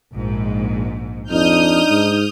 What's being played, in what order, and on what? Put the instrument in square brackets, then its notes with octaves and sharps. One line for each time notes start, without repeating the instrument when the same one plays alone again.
[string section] A#1 G#2
[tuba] F2 [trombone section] D4 D#4 [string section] D#6 F6 G6
[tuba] G#2